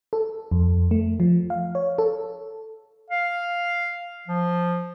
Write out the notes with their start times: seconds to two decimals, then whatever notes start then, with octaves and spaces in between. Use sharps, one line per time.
0.13 A4
0.51 F2
0.91 A3
1.20 F3
1.50 F5
1.75 C#5
1.98 A4
3.10 F5
4.28 F3